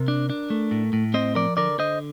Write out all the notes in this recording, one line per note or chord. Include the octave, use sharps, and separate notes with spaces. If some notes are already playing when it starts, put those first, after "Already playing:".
Already playing: C3 A#4
D4
D4
A3
A2
A2
C4 C5 D#5
F3 A#4 D5
D3 A#4 D5
D3 C5 D#5